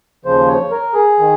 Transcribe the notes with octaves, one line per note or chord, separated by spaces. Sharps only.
D#2 C#3 F3 C5
C#5
A#4
G#4
D#3